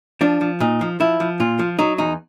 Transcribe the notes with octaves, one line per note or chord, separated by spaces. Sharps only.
F3 D4
F3
A#2 D#4
F3
F3 E4
F3
A#2 F4
F3
F#3 D#4
E2 D#4